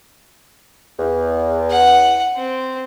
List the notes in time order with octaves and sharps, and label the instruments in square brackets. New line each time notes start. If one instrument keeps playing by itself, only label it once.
[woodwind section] E2
[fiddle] F#5
C4